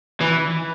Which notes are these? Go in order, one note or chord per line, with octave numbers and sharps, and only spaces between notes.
E3